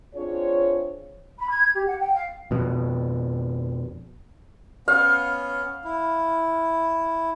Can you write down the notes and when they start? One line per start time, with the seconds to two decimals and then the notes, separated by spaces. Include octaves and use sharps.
0.15 C4 D4 F4 G#4 C#5
1.38 B5
1.50 G#6
1.73 G4
1.85 F#5
1.99 G5
2.12 F5
2.51 F2 B2
4.88 B3 C#4 F5
5.85 E4